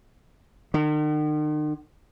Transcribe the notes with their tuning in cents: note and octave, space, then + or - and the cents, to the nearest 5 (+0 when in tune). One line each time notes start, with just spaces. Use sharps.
D#3 -45